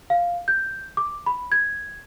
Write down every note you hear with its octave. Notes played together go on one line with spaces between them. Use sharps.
F5
G6
D6
B5
G#6